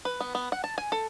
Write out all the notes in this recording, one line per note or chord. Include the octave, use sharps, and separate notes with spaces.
B4
B3
B3
F#5
A5
G#5
A4